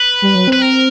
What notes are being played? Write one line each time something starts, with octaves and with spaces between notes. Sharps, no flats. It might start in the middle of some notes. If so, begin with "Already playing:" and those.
Already playing: B4
G3
F#3
C4 B4
A#4